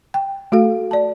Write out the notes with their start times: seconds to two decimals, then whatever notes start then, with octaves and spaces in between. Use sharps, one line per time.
0.14 G5
0.52 A3 F#4 A4 F5
0.91 D5 A5